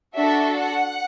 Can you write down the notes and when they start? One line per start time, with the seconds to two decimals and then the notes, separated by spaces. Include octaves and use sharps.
0.15 D4 F#4 A4 E5
0.55 F#5